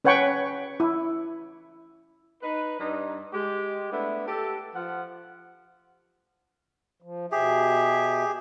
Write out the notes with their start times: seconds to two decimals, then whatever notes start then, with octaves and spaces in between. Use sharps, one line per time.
0.04 C#4 B4 C#5 F#5 G5 C#6
0.80 E4
2.43 D#4 B4
2.80 G2 D#4
3.33 G#3 G4
3.92 A3 B3 D4 E4
4.27 G4 A4
4.75 F3 F#5
7.02 F3
7.32 B2 G4 G#4 E5